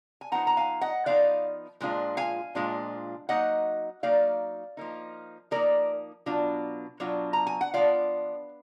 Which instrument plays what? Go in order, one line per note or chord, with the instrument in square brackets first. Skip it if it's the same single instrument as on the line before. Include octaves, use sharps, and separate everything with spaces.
[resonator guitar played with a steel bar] G#5
F3 B3 D#4 F#5 A#5
A#5
F5 G#5
D#5 F#5
F3 B3 D#4 D5 F5
A#2 F3 G#3 D4 F4
F5 G#5
A#2 F3 G#3 D4 F4
F#3 A#3 D#4 D#5 F#5
F#3 A#3 D#4 D5 F5
F3 A#3 D#4
F3 A#3 D#4 A#4 D5
B2 F#3 D4 F4
B2 F#3 D4 F4
A#5
G#5
F#5
F3 B3 D4 F4 D5 F5